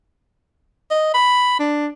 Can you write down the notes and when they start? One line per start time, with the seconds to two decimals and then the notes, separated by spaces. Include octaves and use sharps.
0.91 D#5
1.14 B5
1.59 D4